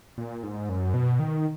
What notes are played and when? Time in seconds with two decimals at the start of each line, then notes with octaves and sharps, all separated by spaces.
0.18 A#2
0.43 G#2
0.69 F#2
0.94 B2
1.19 D#3